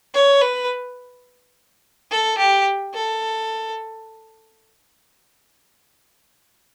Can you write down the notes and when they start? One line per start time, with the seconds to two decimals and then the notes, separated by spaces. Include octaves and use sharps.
0.14 C#5
0.41 B4
2.11 A4
2.38 G4
2.94 A4